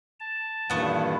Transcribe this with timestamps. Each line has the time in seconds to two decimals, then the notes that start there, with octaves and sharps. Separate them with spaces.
0.20 A5
0.70 G2 A#2 D#3 E3 A3 B3 F#5